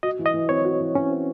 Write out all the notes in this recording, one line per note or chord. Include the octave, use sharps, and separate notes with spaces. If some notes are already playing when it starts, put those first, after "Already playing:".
F#4 D#5
E3
D#5
E3
C4 C#5
F#4
E3
E3 C#4
C4